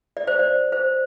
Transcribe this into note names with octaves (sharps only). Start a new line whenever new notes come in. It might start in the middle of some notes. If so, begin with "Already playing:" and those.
D5
C5
D5
C5